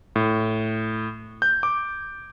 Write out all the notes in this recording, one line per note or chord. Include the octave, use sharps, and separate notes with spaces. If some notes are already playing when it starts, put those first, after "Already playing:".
A2
G6
D6